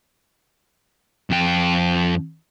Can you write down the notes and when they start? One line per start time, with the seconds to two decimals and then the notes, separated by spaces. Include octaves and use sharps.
1.30 F2 G5